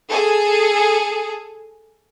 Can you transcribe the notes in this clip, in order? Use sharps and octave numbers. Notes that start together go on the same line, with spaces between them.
G#4 A4